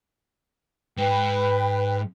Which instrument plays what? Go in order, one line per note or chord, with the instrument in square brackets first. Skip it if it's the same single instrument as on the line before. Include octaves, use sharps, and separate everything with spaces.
[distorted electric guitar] G#2 [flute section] B4 G5